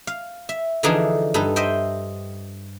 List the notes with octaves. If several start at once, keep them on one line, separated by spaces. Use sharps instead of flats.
F5
E5
D3 E3 F3 D4 D#4 G#4
G2 D#4 A4 B4
C5 D#5 E5 G5